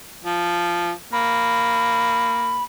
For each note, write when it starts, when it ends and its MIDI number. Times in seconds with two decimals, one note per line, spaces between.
0.24 0.92 53
1.13 2.66 58
1.13 2.63 83